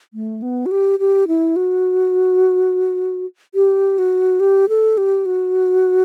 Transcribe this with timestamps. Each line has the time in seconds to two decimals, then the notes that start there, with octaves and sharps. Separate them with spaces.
0.14 A3
0.42 B3
0.66 F#4
0.71 G4
0.99 G4
1.28 E4
1.56 F#4
3.55 G4
3.98 F#4
4.40 G4
4.69 A4
4.98 G4
5.26 F#4